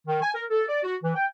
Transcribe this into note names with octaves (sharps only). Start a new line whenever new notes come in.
D#3
G#5
A#4
A4
D5
F#4
E3
G5